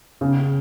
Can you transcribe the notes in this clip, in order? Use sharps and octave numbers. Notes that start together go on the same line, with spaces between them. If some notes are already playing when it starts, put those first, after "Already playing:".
C#3